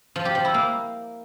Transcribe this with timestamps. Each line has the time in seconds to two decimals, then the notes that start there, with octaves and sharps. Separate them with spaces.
0.16 F3
0.25 G4
0.35 F3
0.45 E4
0.54 A#3